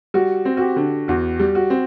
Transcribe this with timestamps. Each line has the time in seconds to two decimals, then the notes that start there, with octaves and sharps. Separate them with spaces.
0.14 G3 F#4
0.45 C4
0.57 F#4
0.61 G4
0.76 D3
1.08 E2 F#4
1.40 G3
1.55 F#4
1.70 C4